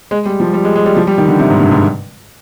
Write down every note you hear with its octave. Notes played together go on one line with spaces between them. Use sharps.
G#3
G3
F3
G3
G#3
G#3
G3
F3
G3
D#3
D3
C3
G#2
G2
G#2